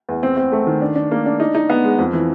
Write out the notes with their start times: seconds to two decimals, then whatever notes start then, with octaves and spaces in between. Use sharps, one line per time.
0.09 E2
0.23 C4
0.37 C4
0.52 A3
0.67 D#3
0.81 D4
0.96 D4
1.11 A#3
1.26 D4
1.40 D#4
1.55 D#4
1.70 B3
1.84 G#3
1.99 F2
2.13 E3